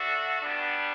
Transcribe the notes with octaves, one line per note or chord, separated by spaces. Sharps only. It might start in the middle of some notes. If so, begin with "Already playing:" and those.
Already playing: D4 F#4 A4 E5
G3 B3 D4